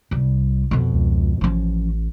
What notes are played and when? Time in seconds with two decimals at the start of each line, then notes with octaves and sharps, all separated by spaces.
0.11 C2 G3
0.71 F2 B2
0.93 C#2
1.41 A1 F3 C#4